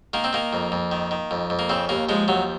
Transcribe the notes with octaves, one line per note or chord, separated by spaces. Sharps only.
D#3 A#3
C4
D#3 A#3
F2
F2
D#3
D#3
F2
F2
A#3
C#3 C4
D#2 A#3
F3 G#3
D#2 F#3